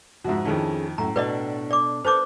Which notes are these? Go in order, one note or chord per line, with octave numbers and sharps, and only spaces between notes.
F2 G#2 F#4 E5
F2 D#3 A3 C#4 E4 G#4
F#2 A2 A3 A#5
B2 D4 A4 B4 D5 D#5
D5 D6
A4 B4 C5 A5 D6 G6